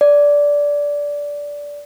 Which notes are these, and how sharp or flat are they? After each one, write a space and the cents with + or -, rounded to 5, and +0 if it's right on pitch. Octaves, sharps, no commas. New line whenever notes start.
D5 -15